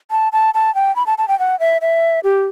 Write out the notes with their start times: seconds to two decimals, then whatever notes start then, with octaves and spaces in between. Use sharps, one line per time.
0.11 A5
0.33 A5
0.54 A5
0.75 G5
0.96 B5
1.07 A5
1.18 A5
1.28 G5
1.39 F#5
1.60 E5
1.82 E5
2.24 G4